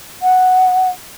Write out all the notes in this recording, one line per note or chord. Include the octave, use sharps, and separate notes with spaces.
F#5